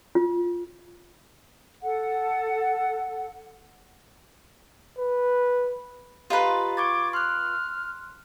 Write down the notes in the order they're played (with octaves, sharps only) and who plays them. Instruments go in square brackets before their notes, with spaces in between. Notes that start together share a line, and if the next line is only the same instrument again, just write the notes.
[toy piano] F4
[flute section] A4 F#5
[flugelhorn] B4
[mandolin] F4 B4 [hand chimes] G4 D#5 A#5
[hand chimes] C#6 G#6 A6 [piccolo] D6
[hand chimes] C6 F#6 [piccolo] F6